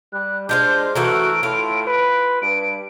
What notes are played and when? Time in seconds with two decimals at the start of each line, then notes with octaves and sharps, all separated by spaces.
0.13 G3 F#6
0.49 G#3 D4 F4 C5 G6
0.95 E3 A3 F#4 A#4 D7
1.43 A2 F4
1.87 B4
2.42 G2 D7